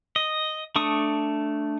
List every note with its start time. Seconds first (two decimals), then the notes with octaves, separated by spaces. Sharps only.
0.16 D#5
0.76 A3 D4 C#6 D#6